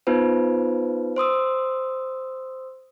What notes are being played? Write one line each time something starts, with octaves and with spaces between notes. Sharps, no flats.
B3 D#4 F4 B4 C5
C5 C6 D#6 E6